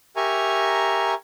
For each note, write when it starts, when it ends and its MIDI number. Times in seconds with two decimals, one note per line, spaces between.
0.16 1.14 67
0.16 1.14 70
0.16 1.14 76
0.16 1.14 80
0.16 1.14 82
0.16 1.14 85